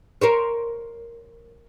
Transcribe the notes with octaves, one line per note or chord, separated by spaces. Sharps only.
A#4 C5 C#5